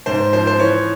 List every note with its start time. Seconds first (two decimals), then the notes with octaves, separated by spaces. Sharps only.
0.06 G#2 C5
0.33 F3 C5
0.47 C5
0.59 E3 C#5